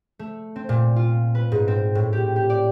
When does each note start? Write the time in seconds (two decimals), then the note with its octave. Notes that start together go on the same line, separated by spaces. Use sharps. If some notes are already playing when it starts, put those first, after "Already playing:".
0.19 A3
0.56 C4
0.69 A#2
0.96 F4
1.35 B4
1.52 G#2
1.68 C4
1.95 A2
2.13 G4
2.36 G4
2.50 D5